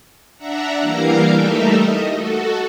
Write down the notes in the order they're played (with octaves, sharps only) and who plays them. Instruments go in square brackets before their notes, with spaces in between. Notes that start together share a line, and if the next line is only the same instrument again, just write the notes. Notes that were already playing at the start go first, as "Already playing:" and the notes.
[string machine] D4 E5 F#5 A#5
E3 G3 A#3 A#4 F5 A#5
G3 A3 D#4 A4 A#4 E5
D#5
F#4 A4